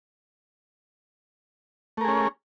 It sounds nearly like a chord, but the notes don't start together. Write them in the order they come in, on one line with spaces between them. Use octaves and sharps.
A3 A#4 G#4 C#4